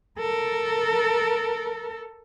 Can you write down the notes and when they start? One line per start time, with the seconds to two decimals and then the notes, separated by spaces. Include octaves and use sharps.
0.19 A4 A#4